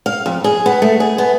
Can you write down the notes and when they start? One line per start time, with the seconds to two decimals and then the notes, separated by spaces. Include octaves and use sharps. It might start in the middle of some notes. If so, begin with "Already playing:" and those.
0.06 F5
0.26 F2
0.44 G#4
0.66 B3
0.82 A3
1.00 G#4
1.18 B3